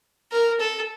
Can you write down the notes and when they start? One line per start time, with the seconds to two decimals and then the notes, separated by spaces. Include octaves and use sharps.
0.32 A#4
0.60 A4